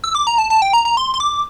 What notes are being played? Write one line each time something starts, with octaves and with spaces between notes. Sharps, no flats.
E6
D6
A#5
A5
A5
G5
A#5
A#5
C6
C6
D6